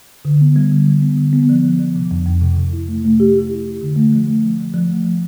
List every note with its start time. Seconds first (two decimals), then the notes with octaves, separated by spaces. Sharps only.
0.25 D3
0.41 B3
0.56 G3
0.72 D3
0.88 D3
1.02 B3
1.18 D3
1.33 B3
1.49 F3
1.65 F3
1.79 F3
1.96 C3
2.11 F2
2.26 F2
2.41 C3
2.57 C3
2.73 E4
2.88 A3
3.04 A3
3.20 G4
3.35 G4
3.50 E4
3.65 G4
3.82 D3
3.96 A3
4.13 F3
4.27 A3
4.43 F3
4.58 F3
4.74 F3
4.90 A3
5.04 F3